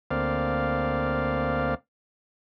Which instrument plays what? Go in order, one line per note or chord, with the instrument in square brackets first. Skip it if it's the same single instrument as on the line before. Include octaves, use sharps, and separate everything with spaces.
[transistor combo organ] D2 A#3 C4 D5 F5